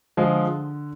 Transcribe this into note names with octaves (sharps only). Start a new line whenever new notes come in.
D3 F3 G#3